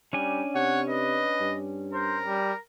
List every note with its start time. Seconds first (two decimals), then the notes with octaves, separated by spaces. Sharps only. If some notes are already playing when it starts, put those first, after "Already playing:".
0.13 G3 C#4 D4 G#5
0.55 C3 C#5 F#5
0.90 B4 D#5
1.41 G2
1.93 A#4 C5
2.25 G3